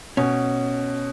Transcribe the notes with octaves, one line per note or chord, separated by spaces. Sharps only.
B2 C#4